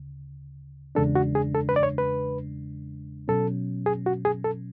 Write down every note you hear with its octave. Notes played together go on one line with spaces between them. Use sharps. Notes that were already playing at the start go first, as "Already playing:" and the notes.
Already playing: D2 C#3
E2 C#3 G#3 D4 A4
F#4
G#4
A4
B4
D5
C#5
B4
B2 F#3 C#4 A4
G#4
F#4
G#4
A4